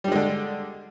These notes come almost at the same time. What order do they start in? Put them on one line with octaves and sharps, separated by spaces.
G3 D4 G#3 D3